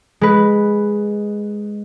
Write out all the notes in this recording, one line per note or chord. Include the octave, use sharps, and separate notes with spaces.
G#3 B4